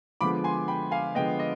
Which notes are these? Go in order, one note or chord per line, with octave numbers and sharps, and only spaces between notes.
D3 F3 G#3 B3 B5 D6
G#5 C6
G5 B5
F5 G#5
D3 F3 G#3 B3 D#5 G5
D#5